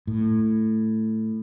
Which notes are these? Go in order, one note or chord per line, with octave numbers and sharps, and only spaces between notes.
A2